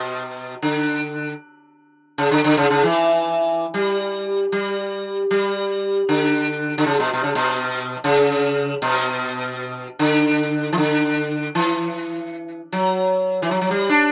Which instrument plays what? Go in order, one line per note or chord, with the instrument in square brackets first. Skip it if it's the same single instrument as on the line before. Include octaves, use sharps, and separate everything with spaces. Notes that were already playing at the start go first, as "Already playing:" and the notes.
Already playing: [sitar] B2
D3
C#3
D3
D3
C#3
C#3
E3
G3
G3
G3
D3
D3
C#3
B2
B2
C#3
B2
C#3
B2
D3
E3
D3
E3
F#3
E3
F#3
F#3
G3
D4